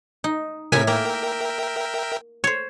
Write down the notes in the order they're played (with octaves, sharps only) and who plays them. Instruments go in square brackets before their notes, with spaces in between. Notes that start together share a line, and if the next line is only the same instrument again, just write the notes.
[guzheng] D#4
[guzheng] A2 E5 G#5 [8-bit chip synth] C3 A#4 B6
[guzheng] A#3 [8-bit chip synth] A#4 E5 G5
[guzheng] C5 C#5